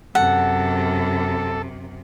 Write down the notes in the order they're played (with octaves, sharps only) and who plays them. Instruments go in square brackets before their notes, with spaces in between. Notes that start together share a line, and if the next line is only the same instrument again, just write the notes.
[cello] F#2 C3 [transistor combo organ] A4 [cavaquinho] F#5